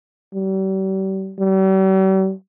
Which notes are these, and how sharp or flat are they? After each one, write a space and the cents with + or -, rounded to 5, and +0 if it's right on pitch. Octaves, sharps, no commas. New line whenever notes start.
G3 -40
G3 -45